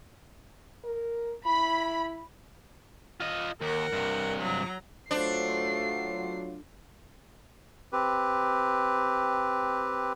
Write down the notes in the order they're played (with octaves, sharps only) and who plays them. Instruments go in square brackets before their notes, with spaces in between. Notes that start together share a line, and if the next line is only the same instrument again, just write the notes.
[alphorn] A#4
[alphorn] E4 [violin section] B5
[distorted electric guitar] F4 D#5
[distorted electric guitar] D#2 [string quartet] A#4 F#5
[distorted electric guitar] G2 C3
[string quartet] F#3 A#5
[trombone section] F#3 F4 [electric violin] A3 C7 [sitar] D4 [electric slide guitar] C5
[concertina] C4 G4 B4